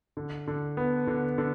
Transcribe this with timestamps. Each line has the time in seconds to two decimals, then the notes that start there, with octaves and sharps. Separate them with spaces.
0.17 D3
0.47 D3
0.77 B3
1.07 D3
1.38 D3